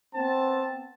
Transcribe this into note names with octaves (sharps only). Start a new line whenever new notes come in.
B3 C4 A5